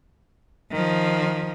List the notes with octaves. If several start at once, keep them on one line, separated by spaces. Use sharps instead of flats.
D#3 F3